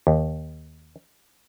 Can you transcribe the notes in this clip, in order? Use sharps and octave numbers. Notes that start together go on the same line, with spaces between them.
D#2